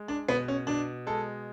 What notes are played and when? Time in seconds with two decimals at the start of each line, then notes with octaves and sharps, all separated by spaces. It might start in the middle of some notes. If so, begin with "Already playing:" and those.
Already playing: G#3
0.08 D4
0.28 B2 B3
0.48 C#4
0.67 B2 D4
1.07 G#3 A4